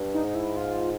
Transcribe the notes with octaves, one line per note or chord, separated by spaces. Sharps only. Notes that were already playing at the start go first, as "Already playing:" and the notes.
Already playing: G2
D#4
G#2
E4
F4